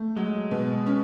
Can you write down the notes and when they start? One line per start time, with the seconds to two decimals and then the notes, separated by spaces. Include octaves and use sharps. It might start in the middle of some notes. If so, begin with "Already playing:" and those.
Already playing: A3
0.16 F#3 G#3
0.51 B2
0.86 C#4